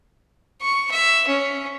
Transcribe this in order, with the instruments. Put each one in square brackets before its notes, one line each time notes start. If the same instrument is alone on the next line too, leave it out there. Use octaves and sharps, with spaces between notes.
[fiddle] C#6
E5
C#4